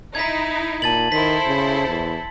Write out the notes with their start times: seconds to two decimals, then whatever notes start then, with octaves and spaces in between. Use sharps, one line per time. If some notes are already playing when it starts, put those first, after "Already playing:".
0.15 D#4 E4 G#6 B6
0.82 A#2 A5 A6 F#7
1.12 D#3 E4 A4 C5 B6
1.47 C#3
1.88 E2